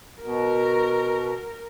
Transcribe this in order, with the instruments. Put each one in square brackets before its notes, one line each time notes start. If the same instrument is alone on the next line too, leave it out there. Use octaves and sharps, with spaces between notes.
[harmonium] B2 [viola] A#4